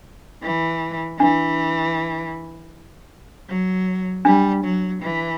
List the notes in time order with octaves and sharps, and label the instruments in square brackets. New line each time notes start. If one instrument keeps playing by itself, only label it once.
[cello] E3
[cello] E3 [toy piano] D4
[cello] F#3
[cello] G3 [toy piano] D4
[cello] F#3
E3